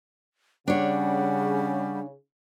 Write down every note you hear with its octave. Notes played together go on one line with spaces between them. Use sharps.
C#3 G3 D4 C#5 F#5